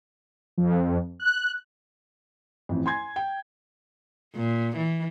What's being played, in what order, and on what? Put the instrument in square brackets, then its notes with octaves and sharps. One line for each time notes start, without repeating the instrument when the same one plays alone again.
[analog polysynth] F2
F#6
[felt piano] A1 F2
G#5 C6 G#6
G5
[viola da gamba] A#2
E3